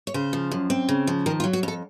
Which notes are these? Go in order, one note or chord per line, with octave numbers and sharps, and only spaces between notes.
C#5
C#3 C5
F3
F#2
C4
C#3
F3
D#3 A#4
F4
F#3
F#4
F2 A4